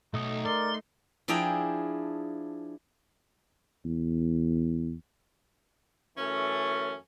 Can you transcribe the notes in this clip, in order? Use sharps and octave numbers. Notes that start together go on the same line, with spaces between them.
B1 A3 D#4 D#6
A#4 D5 C6
F3 D4 E4 G#4 G5 A#5
E2
F#2 E3 A3 C#4